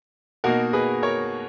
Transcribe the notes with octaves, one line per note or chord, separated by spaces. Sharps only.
B2 A#3 D#4 F#4 A#4
G#4 B4
A#4 C#5